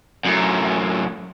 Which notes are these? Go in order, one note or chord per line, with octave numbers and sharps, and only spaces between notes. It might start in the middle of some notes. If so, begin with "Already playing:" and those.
F#2 A2